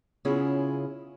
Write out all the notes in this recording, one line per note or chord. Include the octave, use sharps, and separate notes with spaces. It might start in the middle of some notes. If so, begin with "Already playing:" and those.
C#3 B3 C#4 E4 F4 G#4